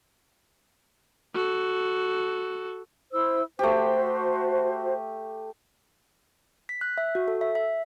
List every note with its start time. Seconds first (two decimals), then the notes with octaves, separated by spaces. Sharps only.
1.35 F#4 A4
3.12 E4 C5 E6
3.59 A3 F#4 G4 C5
6.69 B6
6.81 F#6
6.98 E5
7.15 F#4
7.28 A4
7.41 E5
7.55 E5